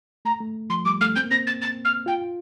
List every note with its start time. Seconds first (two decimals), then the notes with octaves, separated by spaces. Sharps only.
0.25 A3 A#5
0.40 A3
0.70 F3 C6
0.85 G3 D6
1.01 A3 F6
1.16 C4 G6
1.24 A#3
1.31 C4 A#6
1.47 A6
1.62 A6
1.85 F6
2.06 F4 G5